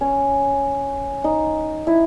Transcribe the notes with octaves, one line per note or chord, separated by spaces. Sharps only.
C#4
D#4
E4